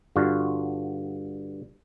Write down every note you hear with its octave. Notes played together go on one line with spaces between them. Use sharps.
G2 D3 F4 F#4